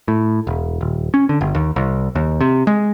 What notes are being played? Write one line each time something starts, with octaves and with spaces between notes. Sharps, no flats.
A2
E1
D#1
C#4
D3
G1
D#2
C2
D#2
C3
G#3